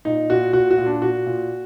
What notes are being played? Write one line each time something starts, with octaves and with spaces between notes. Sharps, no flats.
A#2 D#4
A#2 F#4
A#2 F#4
F#4
A#2
D4
A#2 F#4
A#2